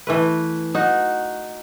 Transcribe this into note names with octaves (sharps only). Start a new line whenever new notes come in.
E3 A3 B4
D#4 F#4